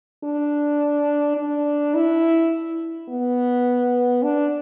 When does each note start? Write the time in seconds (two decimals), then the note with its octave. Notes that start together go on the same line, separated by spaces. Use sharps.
0.24 D4
1.37 D4
1.95 E4
3.09 B3
4.23 D4